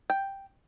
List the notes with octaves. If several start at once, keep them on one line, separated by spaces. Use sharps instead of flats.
G5